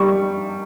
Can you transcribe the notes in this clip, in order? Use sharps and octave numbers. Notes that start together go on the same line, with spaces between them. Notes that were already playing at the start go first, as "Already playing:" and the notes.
Already playing: G3 C#6